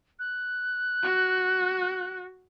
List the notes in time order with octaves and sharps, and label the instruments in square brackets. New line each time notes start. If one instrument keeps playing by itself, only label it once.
[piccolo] F#6
[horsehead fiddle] F#4